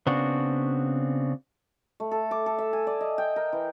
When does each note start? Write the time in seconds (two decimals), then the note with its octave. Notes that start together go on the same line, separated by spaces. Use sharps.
0.07 C#3 B3 C4 D4 F#4
2.00 A3
2.11 A4
2.31 D6
2.46 A4
2.59 E5
2.73 G#5
2.87 D5
3.01 D#5
3.18 G5
3.36 A#4
3.53 E3